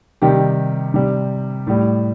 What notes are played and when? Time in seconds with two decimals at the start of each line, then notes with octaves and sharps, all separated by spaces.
0.22 C3 D#3 G3 G4
0.94 C3 G3
1.67 A2 G3